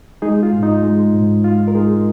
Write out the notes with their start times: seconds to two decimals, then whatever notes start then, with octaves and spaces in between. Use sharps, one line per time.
0.22 G#3 D#4 G#4
0.43 F4
0.53 G#2
0.63 D#4
0.83 G#3
1.14 G#2
1.44 G#3 F4
1.68 A#4
1.75 G#3 D#4 G#4